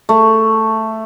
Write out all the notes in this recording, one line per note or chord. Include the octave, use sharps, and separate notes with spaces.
A3